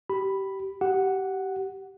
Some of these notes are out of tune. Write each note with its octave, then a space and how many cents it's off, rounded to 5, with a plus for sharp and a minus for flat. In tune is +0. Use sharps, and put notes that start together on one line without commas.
G4 -25 B5 +0
G4 -25 F#5 +0